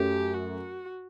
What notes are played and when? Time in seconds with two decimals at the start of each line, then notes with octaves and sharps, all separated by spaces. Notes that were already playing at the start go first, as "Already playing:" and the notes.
Already playing: F#2 F#3 A3 G4
0.33 F#4